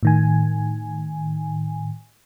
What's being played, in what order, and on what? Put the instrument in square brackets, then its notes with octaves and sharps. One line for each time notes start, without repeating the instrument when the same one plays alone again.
[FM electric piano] A2 D#3 G#5